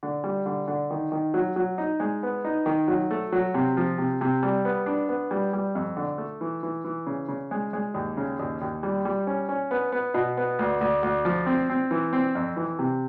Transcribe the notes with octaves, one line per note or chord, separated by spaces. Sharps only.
D3
G3
D3
D3
D#3
D#3
F#3
F#3
D#4
G#3
B3
D#4
D#3
F#3
A3
F#3
C3
F3
C3
C3
G3
B3
D4
B3
G3
G3
F2
D3
A3
E3
E3
E3
C#3
C#3
G#3
G#3
D#2
C#3
D#2
D#2
G3
G3
C#4
C#4
B3
B3
B2
B3
D2
D2
D2
F3
C4
C4
E3
C4
F2
E3
C3